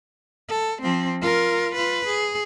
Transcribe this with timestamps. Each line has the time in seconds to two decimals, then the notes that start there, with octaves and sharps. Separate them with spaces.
0.49 A4
0.82 F3 C4
1.22 F4 A#4
1.74 F4 B4
2.07 G#4